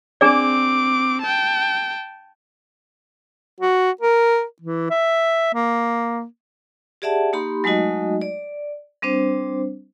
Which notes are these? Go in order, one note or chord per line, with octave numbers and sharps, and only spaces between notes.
C4 D4 G#4 D5 D6
G5 A5
F#4
A#4
E3
E5
A#3
G4 G#4 D5 E5 F#5 A5
A#3 D#4 G4 B5 C6
F#3 G#3 A3 D#4 F#4 D#5
D5
G3 C4 D4 C5